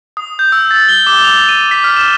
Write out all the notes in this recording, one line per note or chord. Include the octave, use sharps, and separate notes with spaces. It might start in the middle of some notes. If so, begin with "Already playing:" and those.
D#6
G6
E6
A6
G7
D6
F7
D#7
B6
F6
E7